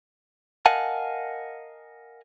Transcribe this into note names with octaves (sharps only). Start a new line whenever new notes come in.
A#4 D#5 F5 F#5 G#5 A5